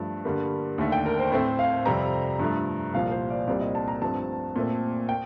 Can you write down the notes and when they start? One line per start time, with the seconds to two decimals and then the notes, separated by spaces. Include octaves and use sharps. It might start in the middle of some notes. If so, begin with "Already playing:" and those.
Already playing: G2 F3 A3 A5
0.25 G2 D3 G3 A#3
0.78 D#2 D3 A3
0.92 G5
1.06 A#4
1.19 C5
1.32 A2 A3 C4 C5
1.59 F5
1.85 F2 C3 G3 C4 A#5
2.39 G2 F3 A3
2.93 C2 A#2 F3 F5
3.11 C5
3.30 D5
3.47 C2 A#2 G3 C4 D5
3.61 D#5
3.75 A5
3.88 A#5
4.02 G2 F3 A3 C4 A5
4.56 A#2 A3 C4
5.09 G5